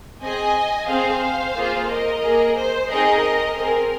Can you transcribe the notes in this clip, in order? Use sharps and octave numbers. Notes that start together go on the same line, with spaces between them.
C4 G#4 D#5 G#5
C4 G#4 C5 F5
A#3 F4 G#4
A#4 D#5
A#3 G#4
C5
C4 D#4 G#4 A#4 D#5
C4 G#4 A#4